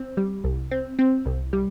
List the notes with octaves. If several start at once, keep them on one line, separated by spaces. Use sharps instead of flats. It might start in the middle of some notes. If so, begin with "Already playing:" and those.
Already playing: C4
G3
C2
C4
C4
C2
G3